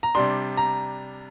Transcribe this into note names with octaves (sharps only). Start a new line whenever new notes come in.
A#5
C3 G3 D4 C6
A#5